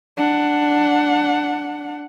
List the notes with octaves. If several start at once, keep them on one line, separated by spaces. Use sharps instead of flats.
D4 F#5